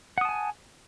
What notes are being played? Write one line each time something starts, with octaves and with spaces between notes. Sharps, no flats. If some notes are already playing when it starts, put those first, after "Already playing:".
F#5 G#5 A5 D#6